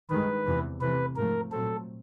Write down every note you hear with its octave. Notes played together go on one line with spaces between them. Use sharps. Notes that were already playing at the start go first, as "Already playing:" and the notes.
G2 D#3 G#3 B4
E2 C3 E3
C3 E3 A3 B4
G#2 F3 A3 A#4
A#2 F#3 A3 C4 A4